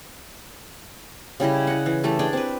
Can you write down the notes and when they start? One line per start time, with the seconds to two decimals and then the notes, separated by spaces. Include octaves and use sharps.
1.40 C#3 G3 E4 D#5
1.67 D#5 F#5
1.86 E3
2.03 E3 A3 G4 A4
2.19 D4 G#4 D5 G5
2.33 C4 G4 B4